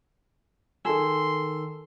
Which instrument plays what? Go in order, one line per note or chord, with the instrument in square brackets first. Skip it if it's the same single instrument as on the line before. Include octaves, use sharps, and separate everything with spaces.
[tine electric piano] D#3 E6 [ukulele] G#4 A4 [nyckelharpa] C6